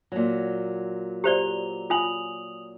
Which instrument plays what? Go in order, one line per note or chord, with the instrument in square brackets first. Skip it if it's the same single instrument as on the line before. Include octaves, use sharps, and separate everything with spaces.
[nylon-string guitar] A#2 F#3
[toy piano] G4 C5 D5 [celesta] A#5 F7 G7
[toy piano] F4 G#5 [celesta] D#6 F7 F#7